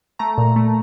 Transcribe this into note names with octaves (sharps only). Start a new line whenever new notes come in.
A3 A#5
A#2
A3